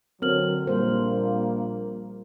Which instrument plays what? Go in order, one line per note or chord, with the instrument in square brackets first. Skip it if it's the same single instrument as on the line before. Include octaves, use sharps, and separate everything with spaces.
[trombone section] D3 F#3 [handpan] C4 [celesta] A#4 F6 F#7
[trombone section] A#1 A#2 A#3 [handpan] G3 C5 [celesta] A#4